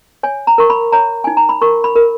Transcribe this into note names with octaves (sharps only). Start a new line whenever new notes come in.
C#5 G#5
A#5
A#4 C#6
B5
C#5 A#5
D#4 G#5
A#5
B5
A#4 C#6
B5
A#4